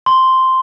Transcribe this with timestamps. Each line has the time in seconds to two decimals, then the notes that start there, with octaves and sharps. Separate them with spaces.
0.06 C6